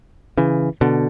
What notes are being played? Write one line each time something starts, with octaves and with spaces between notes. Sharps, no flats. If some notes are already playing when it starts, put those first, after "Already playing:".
C#3 E3
B2 D3